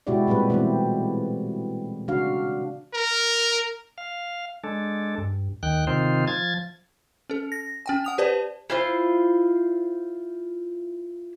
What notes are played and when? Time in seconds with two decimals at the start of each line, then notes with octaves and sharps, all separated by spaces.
0.07 B2 G#3 E4 F#4 G4 D5
0.27 A#2 G3 C4 G4 B4
0.50 B2 E3 A3 B3 C4
2.08 C#3 D4 F#4 F5
2.94 A#4
3.98 F5
4.64 G#3 D4 A4
5.18 G2
5.63 D#2 D#3 G5 F#6
5.87 C3 D#3 C4 D#4 F4 C5
6.27 F3 G#6 A6
7.30 C#4 A4
7.52 A#6
7.86 C#4 G5 G#5
8.04 F#5 D#6 F7
8.18 G4 B4 C5 D5 A5
8.70 E4 F4 C5